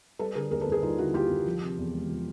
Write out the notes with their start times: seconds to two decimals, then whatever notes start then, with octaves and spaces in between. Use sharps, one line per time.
0.19 G3 A4 B4
0.35 D3 G#4 A#4
0.51 D#2 G#4 A#4
0.61 A4 B4
0.67 D#2
0.72 G#4 A#4
0.83 G3 D#4 F4
0.98 D3 E4 F#4
1.14 D#2 F4 G4
1.30 D#2
1.46 F3
1.62 C3
1.78 E2
1.93 G#3
2.09 F3